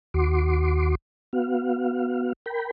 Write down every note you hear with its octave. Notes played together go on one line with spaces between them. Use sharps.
D#2 F#4 C6 D6
B3 F#4 F5
A#4 G5 B5